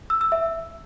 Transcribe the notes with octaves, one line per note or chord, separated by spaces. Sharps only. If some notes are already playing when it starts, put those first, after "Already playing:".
E6
E6
E5